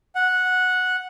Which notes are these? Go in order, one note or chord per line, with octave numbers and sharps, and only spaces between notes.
F#5